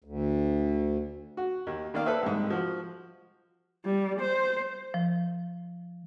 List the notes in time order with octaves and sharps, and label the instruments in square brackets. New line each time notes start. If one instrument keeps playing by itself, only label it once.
[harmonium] D2
[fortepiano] F#4
D#2
D#3 A#3 D5 F5
A4 B4 C5 E5
C2 G#2
F3 F#4
[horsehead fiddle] G3
C5
[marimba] F3